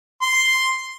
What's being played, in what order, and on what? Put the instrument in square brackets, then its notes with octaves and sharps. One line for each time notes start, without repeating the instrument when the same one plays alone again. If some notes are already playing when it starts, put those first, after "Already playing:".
[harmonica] C6